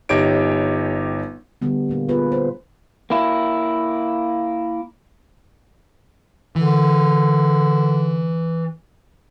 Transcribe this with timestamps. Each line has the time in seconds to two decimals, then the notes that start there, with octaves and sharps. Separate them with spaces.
0.09 G1 D#4 G4 C#5 D7
1.62 D3 G3 B3
1.89 A#2 A#3
2.09 B3 F4 G#4 B4
2.32 C5
3.10 A#3 E4
6.56 D3 E3